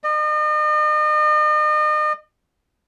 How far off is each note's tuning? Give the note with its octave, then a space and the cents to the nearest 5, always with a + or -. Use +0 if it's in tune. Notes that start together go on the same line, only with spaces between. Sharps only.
D#5 -40